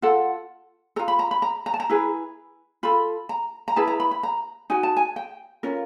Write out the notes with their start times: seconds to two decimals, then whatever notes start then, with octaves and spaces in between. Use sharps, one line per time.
0.02 F4 A4 F#5
0.96 A4 A#5
0.99 F4
1.08 B5
1.19 A#5
1.31 B5
1.42 A#5
1.66 A#5
1.74 A5
1.80 A#5
1.90 E4 G#4 B4
2.83 F4 A4 B5
3.29 A#5
3.68 A#5
3.76 E4 G#4 B4 A5
3.88 A#5
4.00 B5
4.11 B5
4.23 A#5
4.70 D#4 F#4 G#5
4.83 A5
4.97 G#5
5.16 G5
5.63 C#4 F4 A#4